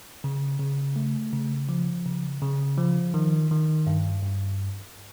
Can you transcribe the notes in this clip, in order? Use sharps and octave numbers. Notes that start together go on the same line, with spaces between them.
C#3
C#3
A3
C#3
F3
C#3
C#3
F3
D#3
D#3
G2
G2